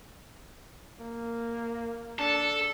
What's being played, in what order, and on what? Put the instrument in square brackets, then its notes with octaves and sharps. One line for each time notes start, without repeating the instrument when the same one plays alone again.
[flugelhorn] A#3
[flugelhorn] D4 [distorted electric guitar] A4